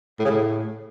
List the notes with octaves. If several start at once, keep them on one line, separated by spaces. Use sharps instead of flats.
A2
C#3
A2